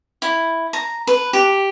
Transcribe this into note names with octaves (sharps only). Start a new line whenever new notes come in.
E4
A#5
B4
G4